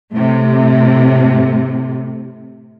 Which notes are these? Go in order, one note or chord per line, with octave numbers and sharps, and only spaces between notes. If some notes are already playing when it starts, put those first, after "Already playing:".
A2 C3